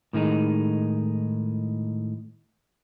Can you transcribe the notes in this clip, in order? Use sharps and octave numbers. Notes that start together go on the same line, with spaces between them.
A2 D#3 G#3 D#4